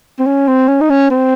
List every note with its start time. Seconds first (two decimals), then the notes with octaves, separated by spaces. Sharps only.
0.19 C4
0.26 C#4
0.47 C4
0.68 C#4
0.81 D#4
0.90 C#4
1.11 C4